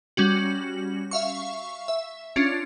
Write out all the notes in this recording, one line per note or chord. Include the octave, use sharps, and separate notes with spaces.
G3 C#4 F#4
E5 F5 C#6
E5
C#4 D4 F4